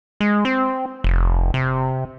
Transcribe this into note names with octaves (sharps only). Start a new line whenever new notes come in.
G#3
C4
F1
C3